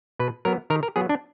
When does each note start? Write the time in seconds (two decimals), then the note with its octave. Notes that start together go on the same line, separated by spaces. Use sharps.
0.19 B2 B4
0.45 F#3 B3 A#4
0.70 D#3 A#4
0.83 A#4
0.96 F#3 B3 G#4
1.09 D4